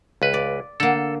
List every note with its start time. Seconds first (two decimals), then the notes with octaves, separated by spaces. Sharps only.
0.22 C#2 B4
0.34 D5
0.80 D3 A#3 A4